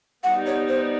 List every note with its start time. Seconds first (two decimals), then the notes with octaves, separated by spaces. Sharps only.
0.24 G3 B3 D#4 F#5
0.47 C#5
0.69 C5